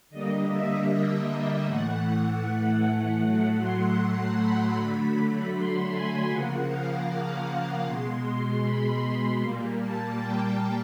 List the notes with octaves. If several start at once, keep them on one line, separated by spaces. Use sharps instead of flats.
D3 G3 A#3 D#5
E5
A2 E3 A3 F#5
F#5
A2 F#3 A3 F#5
C6
C6
B5
D3 F#3 A3 B5
C6
G#5
C#3 F3 A#3 F#5
F5
F#5
B2 G#3 C6
B5
B5
A#2 G3 A#3
A5
G5